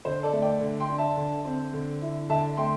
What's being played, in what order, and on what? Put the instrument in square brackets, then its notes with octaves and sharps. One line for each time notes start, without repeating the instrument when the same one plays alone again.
[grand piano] D3 C5
A4 D5
A3
D5 G5
D3
G5 C6
D4
E5 A5
D3
C4
D3
E4
D3 E5 A5
A3 G5 C6